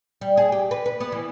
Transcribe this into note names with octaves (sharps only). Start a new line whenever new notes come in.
G3
G#4
G4
B4
B4
B3
E3